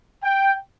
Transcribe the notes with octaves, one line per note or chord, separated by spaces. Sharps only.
G5